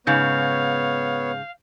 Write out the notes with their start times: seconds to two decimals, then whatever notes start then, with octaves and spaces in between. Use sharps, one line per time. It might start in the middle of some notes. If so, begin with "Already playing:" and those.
0.07 G#2 C#3 B3 C#5 F5 G6